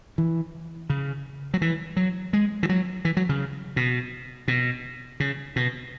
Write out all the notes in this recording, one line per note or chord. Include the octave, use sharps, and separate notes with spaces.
E3
C#3
F#3
E3
F#3
G#3
E3
F#3
E3
F#3
C#3
B2
B2
C#3
B2